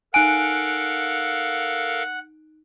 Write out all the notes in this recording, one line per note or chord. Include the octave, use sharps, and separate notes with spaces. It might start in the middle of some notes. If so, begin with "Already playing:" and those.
D#4 A4 A#4 F5 F#5 G#5 F#6 D7